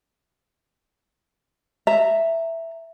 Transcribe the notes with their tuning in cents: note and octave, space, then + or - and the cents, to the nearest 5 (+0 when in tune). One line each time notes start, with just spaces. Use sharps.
E5 +0 A#5 -20